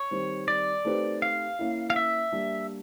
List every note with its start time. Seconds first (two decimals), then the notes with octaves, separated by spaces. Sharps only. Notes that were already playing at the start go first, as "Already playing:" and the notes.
Already playing: C#5
0.11 D#3 G3 C4
0.48 D5
0.85 A3 C4 D#4 G4 B4
1.22 F5
1.59 A#3 C#4 E4
1.90 F5
1.96 E5
2.32 G3 A#3 D4